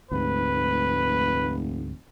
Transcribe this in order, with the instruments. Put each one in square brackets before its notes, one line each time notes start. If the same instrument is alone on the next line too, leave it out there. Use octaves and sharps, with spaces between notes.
[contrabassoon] F1 [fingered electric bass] D2 G#2 [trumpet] B4